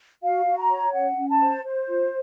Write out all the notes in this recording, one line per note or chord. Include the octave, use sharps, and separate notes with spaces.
F#4 F5
F#4
A#5
C#5
C#4 F#5
C#4
A5
C5
C5
F4